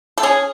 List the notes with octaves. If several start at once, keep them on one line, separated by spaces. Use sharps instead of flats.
A4
C#4 G#4